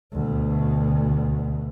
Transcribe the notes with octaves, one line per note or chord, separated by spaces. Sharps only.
D2 B2